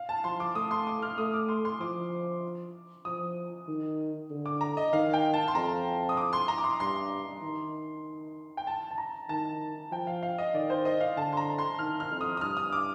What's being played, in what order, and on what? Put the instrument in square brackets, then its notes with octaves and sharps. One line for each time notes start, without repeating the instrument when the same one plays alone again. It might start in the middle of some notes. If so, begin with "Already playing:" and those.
Already playing: [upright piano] F5
A5
[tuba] F3 [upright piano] C6
[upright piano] D6
[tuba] A3 [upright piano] D#6
[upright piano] C6
D6
F6
[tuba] A3 [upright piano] D#6
[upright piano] D6
C6
C6
[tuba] F3 [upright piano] D6
[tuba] F3 [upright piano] D#6
[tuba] D#3
D3
[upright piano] D6
A#5
D#5
[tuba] D#3 [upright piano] F5
[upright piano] G5
A5
C6
[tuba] F2 [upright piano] A#5
[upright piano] D#6
D6
C6
A#5
D6
C6
[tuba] G2 [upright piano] C6
[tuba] D#3
[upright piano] G5
A5
A5
A#5
[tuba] D#3 [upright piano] A5
[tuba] F3 [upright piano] G5
[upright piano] F5
F5
D#5
[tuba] D#3 [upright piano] D5
[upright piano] C5
D#5
F5
[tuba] D3 [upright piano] A5
[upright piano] C6
A#5
C6
[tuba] D#3 [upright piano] F6
[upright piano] F6
[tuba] F2
[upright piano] D#6
D#6
[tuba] G2 [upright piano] F6
[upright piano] D#6
D6